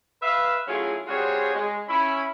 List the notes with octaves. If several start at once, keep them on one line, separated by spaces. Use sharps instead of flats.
B4 E5 F5
F#3 A3 C#4 E4 F4 G#4
G3 C4 F4 F#4 G#4 C#5
G#3
C#4 E4 B5